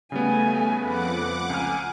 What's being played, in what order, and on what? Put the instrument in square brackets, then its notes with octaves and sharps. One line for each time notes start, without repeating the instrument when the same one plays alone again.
[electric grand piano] C#3 G3 B3 [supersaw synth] A3 [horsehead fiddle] G#5
[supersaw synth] F2 F#5 D6 [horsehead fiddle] B4
[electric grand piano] C#2 F6 [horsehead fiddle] G#5